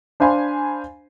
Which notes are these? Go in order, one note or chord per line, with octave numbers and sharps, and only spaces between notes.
D4 C5 F5 G#5 B5 C6